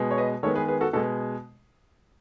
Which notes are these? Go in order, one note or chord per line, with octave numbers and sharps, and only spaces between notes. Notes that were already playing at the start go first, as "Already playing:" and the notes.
Already playing: B2 G#3 B3
C#5
B4 D#5
D#3 G#3 B3 A4 C#5
G#4 B4
G#4 B4
F#4 A4
B2 G#3 B3 F#4 A4